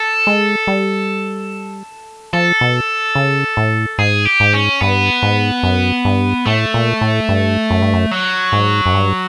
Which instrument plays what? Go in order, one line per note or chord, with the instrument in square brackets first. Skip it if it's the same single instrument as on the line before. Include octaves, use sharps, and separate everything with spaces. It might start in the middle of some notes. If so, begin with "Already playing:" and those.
Already playing: [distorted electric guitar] A4
[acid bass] G#3
G3
[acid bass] F3 [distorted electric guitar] A4
[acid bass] B2
C#3
A2
[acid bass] G#2 [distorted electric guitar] G#4
[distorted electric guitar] G4
[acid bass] G#2
[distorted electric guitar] C#4
[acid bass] G2 [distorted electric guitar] B3
[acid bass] G#2
F#2
G2
[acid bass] A2 [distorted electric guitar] A3
[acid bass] A#2
A2
G2
F#2
G2
F#2
[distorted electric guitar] F#3
[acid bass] G#2
F#2
G2